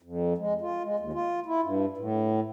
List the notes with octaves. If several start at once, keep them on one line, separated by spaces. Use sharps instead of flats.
F2
G#3
F4
G#3
D#2
F4
E4
G2
A2